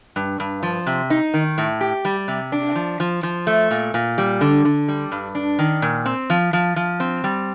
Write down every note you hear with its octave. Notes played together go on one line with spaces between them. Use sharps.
G2
G2
F3
C3
D#4
D#3
A2
G4
G3
C3
D4
F3
F3
F3
A3
A#2
A#2
G3
D3
D3
G3
G2
D4
D#3
A#2
C4
F3
F3
F3
C4
G3